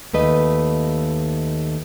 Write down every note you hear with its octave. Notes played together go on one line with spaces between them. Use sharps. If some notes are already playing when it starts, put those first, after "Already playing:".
D#2 A3 B4 D#5